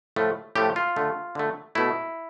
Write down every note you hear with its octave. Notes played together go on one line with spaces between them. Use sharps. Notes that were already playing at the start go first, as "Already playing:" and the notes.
A2 F3 A3
A2 F3 A3 G4
F4
D3 A3
D3 A3
B2 A3 E4